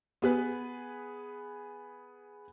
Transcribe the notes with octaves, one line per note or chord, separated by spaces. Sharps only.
B3 G#4 B4